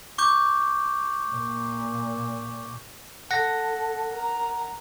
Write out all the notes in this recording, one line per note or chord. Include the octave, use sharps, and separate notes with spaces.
C#6 D6 G6
A#2
A4 F#5 A#6
A#4 A#5